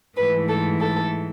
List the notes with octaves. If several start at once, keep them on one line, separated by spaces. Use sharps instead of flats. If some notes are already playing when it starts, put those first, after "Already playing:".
G#2 E3 A3 B4
A4
A4